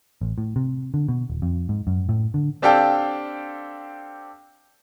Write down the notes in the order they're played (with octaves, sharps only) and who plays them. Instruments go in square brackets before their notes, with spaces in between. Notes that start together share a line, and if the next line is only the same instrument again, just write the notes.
[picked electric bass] A1
A2
C3
D3
B2
D#1
F2
G#2
F#2
A2
D3
[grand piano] C4 D4 G4 A4 F5 G5